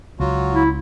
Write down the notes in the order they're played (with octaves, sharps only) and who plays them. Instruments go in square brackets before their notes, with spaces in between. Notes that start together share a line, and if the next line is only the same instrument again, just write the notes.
[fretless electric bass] C#2 [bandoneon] F#3 F4 F#4
[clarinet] E4